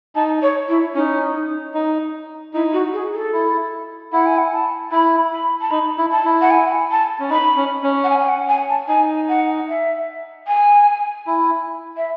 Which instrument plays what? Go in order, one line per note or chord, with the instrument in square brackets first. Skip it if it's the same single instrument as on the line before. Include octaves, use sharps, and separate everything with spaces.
[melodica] D#4 [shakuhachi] A5
[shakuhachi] C#5
E4
[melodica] C#4 [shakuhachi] D#4
[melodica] D#4
[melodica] D#4 [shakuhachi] E4
[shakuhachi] F#4
G#4
A4
[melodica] E4
[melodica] E4 [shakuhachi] F#5
[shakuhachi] G#5
F#5
A5
[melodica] E4 [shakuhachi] B5
[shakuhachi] B5
A5
[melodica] D#4 [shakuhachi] B5
[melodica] E4
[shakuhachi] A5
[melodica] E4
[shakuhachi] F#5
G#5
A5
[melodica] C#4
[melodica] D#4 [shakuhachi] B5
[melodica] C#4
C#4
[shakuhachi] F#5
G#5
G#5
F#5
G#5
A5
[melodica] D#4 [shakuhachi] G#5
[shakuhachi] F#5
E5
G#5
[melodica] E4
[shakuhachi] E5